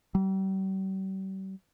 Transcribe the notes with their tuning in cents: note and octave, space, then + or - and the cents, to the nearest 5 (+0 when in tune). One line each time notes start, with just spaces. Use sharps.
G3 -40